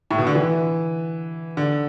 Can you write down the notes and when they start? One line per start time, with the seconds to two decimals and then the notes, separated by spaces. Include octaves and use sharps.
0.11 A2
0.18 B2
0.27 D3
0.35 E3
1.57 D3